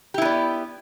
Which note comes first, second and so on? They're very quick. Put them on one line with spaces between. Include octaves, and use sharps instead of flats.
G4 E4 B3 D5